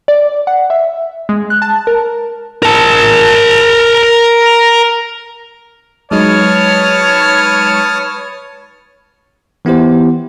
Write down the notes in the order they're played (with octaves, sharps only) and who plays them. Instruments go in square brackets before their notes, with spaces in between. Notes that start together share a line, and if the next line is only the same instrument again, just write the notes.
[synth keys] D5
F#5
E5
G#3
F#6
A5
A#4
[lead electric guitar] A#4 A5
[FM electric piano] F#3 G#3 D#4 [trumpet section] B4 C#5 [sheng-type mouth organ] A5 D#6 F6
[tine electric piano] E3 B3 E4 G4 C5